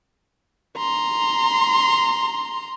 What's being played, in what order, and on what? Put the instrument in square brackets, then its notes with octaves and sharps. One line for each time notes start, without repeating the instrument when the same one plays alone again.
[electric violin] A#5 C6